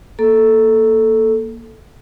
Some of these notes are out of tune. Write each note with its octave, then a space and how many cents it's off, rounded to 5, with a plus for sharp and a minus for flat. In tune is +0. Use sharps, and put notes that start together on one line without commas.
A#3 +0 A4 +0